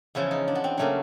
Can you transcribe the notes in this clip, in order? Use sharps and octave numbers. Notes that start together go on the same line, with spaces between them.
E2 C#3 F3 E4
D#4
D4
B3
C4
C#3 F#3 A3 A#3